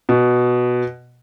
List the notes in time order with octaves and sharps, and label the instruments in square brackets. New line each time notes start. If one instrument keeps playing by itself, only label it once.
[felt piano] B2